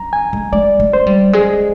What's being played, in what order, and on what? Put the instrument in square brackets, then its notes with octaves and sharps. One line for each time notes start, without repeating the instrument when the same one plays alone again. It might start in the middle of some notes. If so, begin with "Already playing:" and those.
Already playing: [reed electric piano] A#5
G#5
[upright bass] G#3
[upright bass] G#3 [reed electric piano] D5
[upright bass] G#3
[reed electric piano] C5
[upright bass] G3
[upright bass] G#3 [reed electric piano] G#4